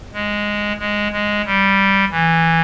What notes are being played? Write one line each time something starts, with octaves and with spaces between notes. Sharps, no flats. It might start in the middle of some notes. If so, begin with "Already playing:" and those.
G#3
G#3
G#3
G3
E3